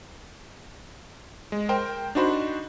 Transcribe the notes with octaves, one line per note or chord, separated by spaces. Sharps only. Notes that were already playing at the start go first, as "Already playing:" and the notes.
G#3
A#4 C5 G5
D4 D#4 F#4 C5 B5